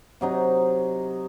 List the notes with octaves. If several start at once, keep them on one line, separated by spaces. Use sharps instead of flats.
C3 F#3 D#4